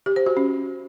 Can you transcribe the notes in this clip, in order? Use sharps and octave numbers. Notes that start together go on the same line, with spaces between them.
G4
C5
F#4
C#4